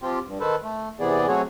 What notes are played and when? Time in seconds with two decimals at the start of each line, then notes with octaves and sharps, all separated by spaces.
0.02 F3 C4 F4 G4
0.26 G2
0.40 D#3 A4 B4 C5
0.63 A3
1.00 E2 C3 E3 B3 G#4 D5
1.28 F#3 A3 C4 F#4 G#4 C#5